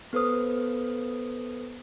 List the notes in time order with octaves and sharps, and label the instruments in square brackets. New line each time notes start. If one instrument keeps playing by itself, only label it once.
[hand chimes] B3 A4 B4 C5 D#6 F6